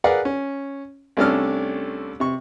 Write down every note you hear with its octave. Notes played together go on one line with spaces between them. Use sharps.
G#4 A#4 B4 D5 F5 F#5
C#4
C2 A3 C#4 D4 A4 F6
C3 C#6